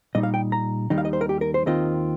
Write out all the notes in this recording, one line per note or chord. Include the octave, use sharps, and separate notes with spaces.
A#2 G3 D#4 D#5
F5
G5
A#5
D#2 D#3 G3 D#4
F5
D#5
C5
A#4
G4
A#4
C5
D#2 D#3 C4 F4 D#5